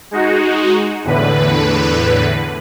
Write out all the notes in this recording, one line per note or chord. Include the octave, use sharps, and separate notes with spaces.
G#3 D#4 F#4
E2 A2 D3 B4